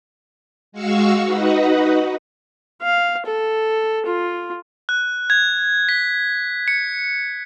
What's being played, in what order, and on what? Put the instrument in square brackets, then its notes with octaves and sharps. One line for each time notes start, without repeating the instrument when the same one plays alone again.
[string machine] G#3 F#4 F5 C#6 E6
D#4 F#4 B4 D#5 F#5
[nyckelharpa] F5
A4
F4
[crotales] F#6
G#6
B6
C#7